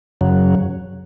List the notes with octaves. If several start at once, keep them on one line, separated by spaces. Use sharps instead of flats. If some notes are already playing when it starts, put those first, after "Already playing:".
F#2 C#3 F#3